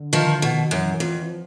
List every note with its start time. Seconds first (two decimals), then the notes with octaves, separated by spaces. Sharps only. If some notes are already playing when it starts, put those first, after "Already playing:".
Already playing: D3
0.13 D#3 F3
0.42 B2 D#3
0.71 F#2 E3
1.00 F2
1.21 E3
1.29 F3